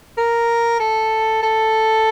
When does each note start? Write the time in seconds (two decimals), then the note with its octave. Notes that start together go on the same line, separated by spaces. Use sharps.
0.18 A#4
0.80 A4
1.43 A4